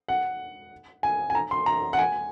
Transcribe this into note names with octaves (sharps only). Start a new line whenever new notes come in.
F#5
G#5
G#5
A#5
C6
A#5
F#5
G#5